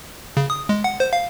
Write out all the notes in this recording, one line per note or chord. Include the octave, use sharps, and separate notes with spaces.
C#3
D#6
G#3
F#5
C5
F5